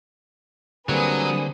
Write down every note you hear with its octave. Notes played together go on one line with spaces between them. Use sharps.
D3 F#3 G3 A#3 C4 G#4 B4 D#6